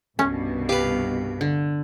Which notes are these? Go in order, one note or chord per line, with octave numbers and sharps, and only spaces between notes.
C2 G2 B2 C#4
G4 B4 F5
D3